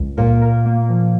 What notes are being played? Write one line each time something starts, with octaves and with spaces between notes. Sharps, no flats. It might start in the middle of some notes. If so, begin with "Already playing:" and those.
Already playing: C#2
A#2 A#4
A#4
A#3
F3